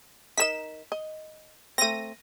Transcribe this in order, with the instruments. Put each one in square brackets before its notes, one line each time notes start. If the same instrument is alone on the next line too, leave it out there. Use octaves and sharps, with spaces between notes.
[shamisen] D#4 A#4 D#5 [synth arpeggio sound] B6 E7
[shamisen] D#5
[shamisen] A3 C4 [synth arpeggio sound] A#6 D#7